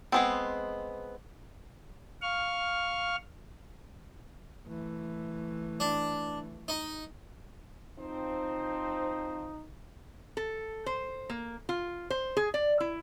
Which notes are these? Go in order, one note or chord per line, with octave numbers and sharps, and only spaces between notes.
G#3 B3 C4
F5 C#6 F6
E3 A3
D4
D#4
F3 C4 D#4 C5
A4
C5
A#3
F4
C5
G#4
D5
E4